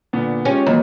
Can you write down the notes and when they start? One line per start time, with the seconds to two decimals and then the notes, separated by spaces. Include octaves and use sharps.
0.13 A#2 D3 B3
0.45 G#3 C#4 F4 G4
0.66 D#2 E3 F#3